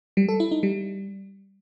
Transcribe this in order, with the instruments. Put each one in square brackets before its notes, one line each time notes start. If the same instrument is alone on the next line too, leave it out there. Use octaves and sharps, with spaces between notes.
[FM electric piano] G3
A4
E4
D#4
G3